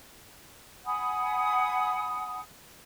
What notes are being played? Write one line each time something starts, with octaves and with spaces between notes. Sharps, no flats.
F#5 G#5 B5 D#6